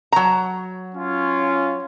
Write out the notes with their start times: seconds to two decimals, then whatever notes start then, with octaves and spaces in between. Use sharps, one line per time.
0.12 F#3 A#5
0.95 C#4 F4